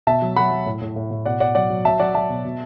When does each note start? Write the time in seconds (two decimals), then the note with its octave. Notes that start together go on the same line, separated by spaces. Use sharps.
0.07 B2 E5 A5
0.22 F#3
0.36 F#3 F#5 B5
0.51 F#3
0.66 A2
0.81 A2
0.96 A2
1.11 A2
1.25 B2 D5 F#5
1.40 B2 D5 F#5
1.55 F#3 D5 F#5
1.70 F#3
1.85 F#3 E5 A5
2.00 F#3 D5 F#5
2.14 F#3 E5 A5
2.30 B2
2.45 B2